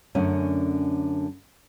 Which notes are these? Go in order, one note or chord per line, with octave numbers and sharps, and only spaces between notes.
F#2 D3 A3 C#4